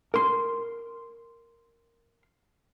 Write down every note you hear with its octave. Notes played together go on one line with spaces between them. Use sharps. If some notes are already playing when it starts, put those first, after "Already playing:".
A#4 C6